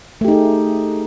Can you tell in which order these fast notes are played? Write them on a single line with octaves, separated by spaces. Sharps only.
A3 G4 D#4 G#4